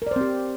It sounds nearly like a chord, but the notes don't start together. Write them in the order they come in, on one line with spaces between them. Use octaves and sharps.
A#4 D5 C5 C4 G4